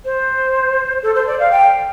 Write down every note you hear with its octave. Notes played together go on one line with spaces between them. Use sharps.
C5
A4
C5
D5
F5
G5